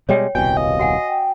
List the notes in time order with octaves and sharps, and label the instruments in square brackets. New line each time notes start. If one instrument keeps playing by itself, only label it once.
[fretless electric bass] B2 G3 G#3 [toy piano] C#5 G5
[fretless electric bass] D#1 C2 B2 [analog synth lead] G5 [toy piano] G#5
[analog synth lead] D#5 [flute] F5
[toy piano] F#4 F#5 G#5
[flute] G5